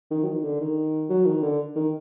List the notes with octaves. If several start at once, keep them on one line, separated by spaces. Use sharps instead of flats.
D#3
F#3
D#3
D3
D#3
F#3
D#3
D3
D#3